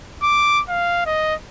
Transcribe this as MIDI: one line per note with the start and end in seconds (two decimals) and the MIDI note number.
0.23 0.62 86
0.69 1.04 77
1.06 1.35 75